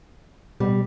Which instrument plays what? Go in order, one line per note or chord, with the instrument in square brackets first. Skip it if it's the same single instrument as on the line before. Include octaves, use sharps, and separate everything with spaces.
[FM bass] B2 [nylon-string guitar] G3